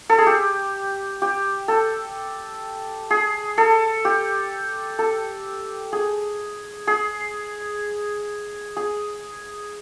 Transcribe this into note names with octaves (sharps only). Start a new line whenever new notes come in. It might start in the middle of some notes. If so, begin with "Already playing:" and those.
A4
G#4
G4
G4
A4
G#4
A4
G4
A4
G#4
G#4
G#4